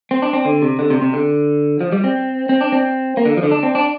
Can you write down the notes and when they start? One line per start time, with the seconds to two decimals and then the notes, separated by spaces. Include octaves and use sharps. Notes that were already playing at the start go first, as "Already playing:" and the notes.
0.11 C4
0.22 D4
0.33 C4
0.45 D3
0.62 C3
0.79 D3
0.90 C3
1.01 C3
1.13 D3
1.81 F3
1.92 G3
2.04 C4
2.49 C4
2.61 D4
2.72 C4
3.17 A#3
3.25 D3
3.37 F3
3.43 D3
3.51 D4
3.63 C4
3.75 D4